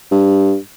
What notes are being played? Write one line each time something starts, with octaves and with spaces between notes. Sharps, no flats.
G2